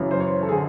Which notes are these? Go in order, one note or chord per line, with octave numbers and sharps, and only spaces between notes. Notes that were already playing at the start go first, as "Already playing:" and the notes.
Already playing: F#2 C#3 E3
C5
C#5
A4
D3 G#4